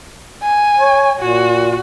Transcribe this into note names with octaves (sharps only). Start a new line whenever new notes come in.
G#5
C#5
A#2 F#4